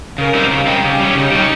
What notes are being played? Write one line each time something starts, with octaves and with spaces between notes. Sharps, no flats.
C#3 A#4
G3 C4 D#4
C#3
G3 C4 D#4
C#3 G4
G3 C#4
C#3 D#4
G3 C#4